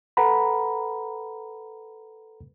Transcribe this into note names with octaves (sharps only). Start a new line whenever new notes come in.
A4 B4 F#5 A#5 B5